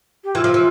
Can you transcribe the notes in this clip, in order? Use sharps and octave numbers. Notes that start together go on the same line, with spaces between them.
G4
E3 F4
F3
E3